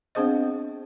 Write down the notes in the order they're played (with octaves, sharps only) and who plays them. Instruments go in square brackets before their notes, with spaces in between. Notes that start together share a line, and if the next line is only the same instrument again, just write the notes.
[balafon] B3 C4 D4 G#4 C5 D#5